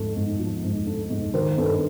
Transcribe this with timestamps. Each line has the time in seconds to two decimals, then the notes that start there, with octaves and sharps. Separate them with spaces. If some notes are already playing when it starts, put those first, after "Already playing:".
Already playing: G#2 F3 A3
0.16 G#2
0.39 F3
0.64 G#2
0.86 A3
1.10 G#2
1.34 D#3 A#4 C5
1.57 G2 A4 B4